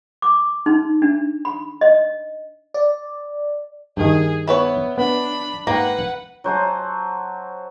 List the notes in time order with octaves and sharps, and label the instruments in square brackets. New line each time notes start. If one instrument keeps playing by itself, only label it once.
[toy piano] D6
D#4
D4
B5
D#5
[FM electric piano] D5
[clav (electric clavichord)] G2 D#3 [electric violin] G#4
[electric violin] B3 [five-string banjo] E4 B4 C#5
[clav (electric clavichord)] B3 [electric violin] D4 B5
[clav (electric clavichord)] G#2 G5 [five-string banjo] A#3 [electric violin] B4 F#5
[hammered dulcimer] F#3 C5 G#5 A5